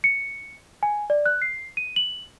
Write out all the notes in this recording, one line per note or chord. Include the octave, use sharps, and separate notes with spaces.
C#7
G#5
D5
F#6
C7
D#7
F#7